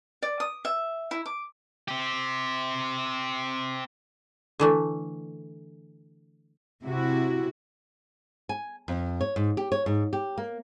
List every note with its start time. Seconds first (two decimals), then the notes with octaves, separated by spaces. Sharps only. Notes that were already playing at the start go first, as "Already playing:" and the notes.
0.23 D5
0.40 D#6
0.65 E5
1.11 E4
1.26 D6
1.88 C4 G4
4.60 D3 E3 A3
6.83 C3 E4 F#4
8.49 G#5
8.88 F2
9.21 C#5
9.36 G#2
9.57 G4
9.72 C#5
9.86 G#2
10.13 G4
10.38 A#3